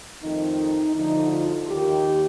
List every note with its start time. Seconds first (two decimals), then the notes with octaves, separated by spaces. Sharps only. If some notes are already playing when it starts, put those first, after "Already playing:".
0.23 F2 D#3 A3 C4 D#4
0.95 D2 D3 F3 D#4
1.31 F4
1.69 D#2 D#3 A#3 G4